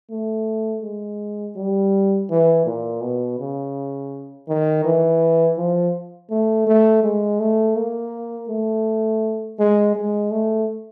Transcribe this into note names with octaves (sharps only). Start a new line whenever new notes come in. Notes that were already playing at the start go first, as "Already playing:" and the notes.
A3
G#3
G3
E3
A#2
B2
C#3
D#3
E3
F3
A3
A3
G#3
A3
A#3
A3
G#3
G#3
A3